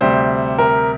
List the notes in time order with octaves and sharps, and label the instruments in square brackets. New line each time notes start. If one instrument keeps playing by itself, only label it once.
[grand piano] D2 C3 G3 C5
A#4